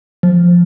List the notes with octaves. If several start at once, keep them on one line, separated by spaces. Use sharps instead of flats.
F3